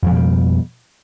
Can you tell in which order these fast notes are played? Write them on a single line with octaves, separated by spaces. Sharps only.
F2 F3 B2 G3